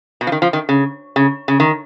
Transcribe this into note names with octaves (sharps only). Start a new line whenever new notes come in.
B2
F3
D#3
F3
D#3
C#3
C#3
C#3
D#3